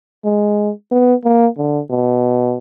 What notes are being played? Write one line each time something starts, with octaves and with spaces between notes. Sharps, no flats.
G#3
B3
A#3
D3
B2